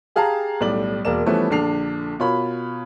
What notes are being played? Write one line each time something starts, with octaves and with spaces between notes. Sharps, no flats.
G4 G#4 F5 A5 A#5
B1 A2 G3 D5 F#7
E1 A#3 A#4 D5 E7
E3 F3 G3 A3 B3 C#4
A#1 D3 D4 C7 F7
B2 F4 A#4 C#5 B5